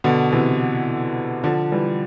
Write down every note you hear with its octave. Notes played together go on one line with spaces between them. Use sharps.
B2 D3
C3 E3
D3 F3
E3 G3